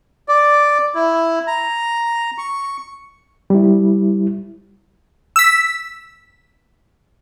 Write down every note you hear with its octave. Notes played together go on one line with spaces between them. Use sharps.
D5
E4
A#5
C#6
G3 E4
E6 B6